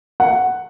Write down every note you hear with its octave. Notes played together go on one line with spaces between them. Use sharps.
F#5